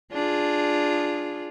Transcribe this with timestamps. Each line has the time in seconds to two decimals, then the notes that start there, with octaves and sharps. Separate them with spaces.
0.13 D4 F4 G#4